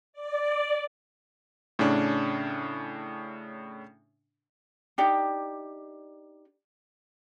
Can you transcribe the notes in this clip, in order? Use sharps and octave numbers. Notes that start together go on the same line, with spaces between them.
D5
A2 C#3 C#4 D4
D4 D#4 G4 D5